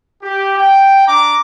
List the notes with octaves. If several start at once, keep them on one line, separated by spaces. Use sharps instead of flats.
G4
G5
D4 A#5 D6